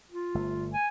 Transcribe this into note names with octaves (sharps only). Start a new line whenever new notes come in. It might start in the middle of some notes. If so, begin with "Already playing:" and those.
F4
G1 A3
G#5